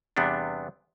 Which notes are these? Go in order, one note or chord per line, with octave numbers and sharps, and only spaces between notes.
E2 C3 G3 B3 D4